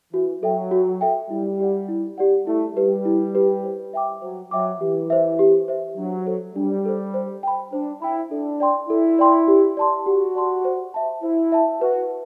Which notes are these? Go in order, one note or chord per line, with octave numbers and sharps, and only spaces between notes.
E3 F#4
F#3 A4 E5 G5
F#4
A4 E5 G5
G3 E4
G4 D5 F#5
E4
G4 D5 F#5
A3 E4
G3 G4 B4
E4
G4 B4
C5
E5 G5 D6
F#3 C5
F#3 E5 G5 D6
E3 G4
C5 E5
G4
C5 E5
F#3 D4
A4 C5
G3 D4
A4 C5
C5
G5 B5
D4 C5
E4 G5 B5
D4 A4
D5 G5 C6
E4 A4
D5 G5 C6
G4
D5 A5 C6
F#4 G4
D5 A5 C6
C5
E5 A5
E4 C5
E5 A5
F#4 B4